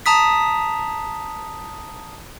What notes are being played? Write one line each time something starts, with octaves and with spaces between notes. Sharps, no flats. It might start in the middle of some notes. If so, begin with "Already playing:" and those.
A5 A#5 D#6 B6